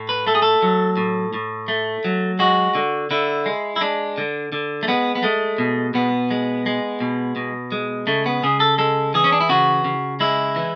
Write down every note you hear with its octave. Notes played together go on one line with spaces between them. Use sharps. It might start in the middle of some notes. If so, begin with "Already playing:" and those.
Already playing: A2
B4
A3 A4
G#4
A4
F#3
A2
A2
A3
F#3
G#3 F#4
D3
D3 E4
G#3
E4
G#3 D4
D3
D3
A3
G#3 B3
B3
G#3 A3
B2
B2 B3
G#3
G#3
B2
B2
G#3
C#3 A3
B3
C#3 G#4
A4
G#3 A4
E3 G#4
C#4
D4
E4
C#3 F#4
C#3
G#3 E4
E3